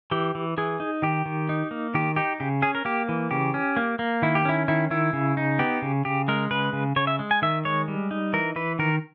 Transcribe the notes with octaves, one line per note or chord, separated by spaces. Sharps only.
E3 G4
E3
E3 G#4
D#4
D#3 G4
D#3
D#4
A#3
D#3 G4
D#4 G4
C#3 G4
C#4 G#4
A#4
A#3 G4
E3
C#3 G4
C#4
A#3
A#3
D#3 E4
G4
C#4 E4
D#3 E4
D#3 E4
C#3
D#4
B3 G4
C#3
C#3 G4
G#3 A#4
C#3 B4
C#3
C#3 C#5
E5
G#3
G#5
D#3 E5
G#3 C#5
G3
D#4
E3 A#4
E3 B4
D#3 A#4